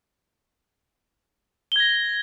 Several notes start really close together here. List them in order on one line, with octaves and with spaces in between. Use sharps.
G7 G#6 A#6